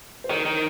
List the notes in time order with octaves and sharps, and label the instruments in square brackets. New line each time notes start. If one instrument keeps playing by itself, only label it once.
[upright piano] C5
[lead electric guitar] D#3 [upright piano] C#5
[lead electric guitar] D#3